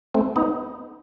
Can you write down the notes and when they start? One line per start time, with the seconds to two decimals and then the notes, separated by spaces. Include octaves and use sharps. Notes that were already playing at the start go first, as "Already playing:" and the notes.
0.14 A3 C4
0.36 B3 D#4